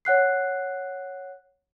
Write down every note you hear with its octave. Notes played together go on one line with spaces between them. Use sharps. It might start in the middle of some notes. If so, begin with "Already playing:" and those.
C#5 F#5 F#6 C7